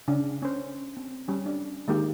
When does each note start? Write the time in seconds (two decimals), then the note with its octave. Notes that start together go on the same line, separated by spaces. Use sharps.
0.08 C#3 D4
0.42 C#4 C5
0.97 C4
1.28 G3 C#4
1.46 D4
1.88 D#3 G#3 A#3 D#4 G4